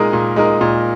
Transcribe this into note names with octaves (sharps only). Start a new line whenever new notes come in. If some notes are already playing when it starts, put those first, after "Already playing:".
Already playing: A#2 G#3 D#4 A#4
A#2
G#3 D#4 A#4
A#2